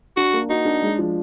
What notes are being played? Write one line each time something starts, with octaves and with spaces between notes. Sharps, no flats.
D4 F#4
A#3
D#4 F#4
D4
G#3
F3